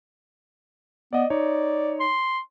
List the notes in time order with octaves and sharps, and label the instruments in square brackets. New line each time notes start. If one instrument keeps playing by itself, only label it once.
[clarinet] B3 [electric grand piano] D5 D#5
[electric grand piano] D#4 C#5 [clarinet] D5
[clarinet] C6